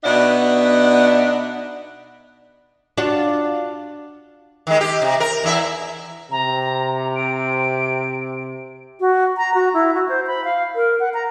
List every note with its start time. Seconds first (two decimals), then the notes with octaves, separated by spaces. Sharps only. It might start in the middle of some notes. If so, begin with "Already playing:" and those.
0.04 B2 B3 D4 D#4 E5 F#5
2.97 D4 F4 F#4
4.67 D#3 G#3
4.81 G4
5.02 C3
5.20 A#4
5.44 E2 E4 E5
6.31 C3 A#5
7.16 D7
9.00 F#4
9.37 A#5
9.55 F#4
9.74 E4
9.94 F#4
10.09 C5
10.27 B5
10.45 F5
10.76 A#4
11.00 F#5
11.14 A#5